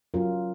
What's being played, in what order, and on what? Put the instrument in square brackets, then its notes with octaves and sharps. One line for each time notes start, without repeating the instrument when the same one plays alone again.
[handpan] F#3 C#4 F4 A#4